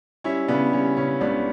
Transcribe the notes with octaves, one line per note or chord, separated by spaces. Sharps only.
G3 C#4 E4
C#3 B3 D4
G3 C#4
C#3 C#4
C#2 B3 D4